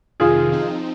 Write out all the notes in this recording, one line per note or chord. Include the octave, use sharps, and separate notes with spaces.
F2 C3 D#3 F4 G#4
F3 C4 D#4